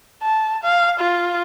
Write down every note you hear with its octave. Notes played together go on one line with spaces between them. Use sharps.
A5
F5
F4